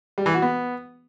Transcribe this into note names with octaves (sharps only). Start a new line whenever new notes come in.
G3
E3
F#4
B3